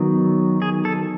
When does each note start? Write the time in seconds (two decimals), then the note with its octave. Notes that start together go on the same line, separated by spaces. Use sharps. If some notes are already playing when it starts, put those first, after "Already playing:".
Already playing: D#3 F#3 B3
0.62 G#4
0.85 A4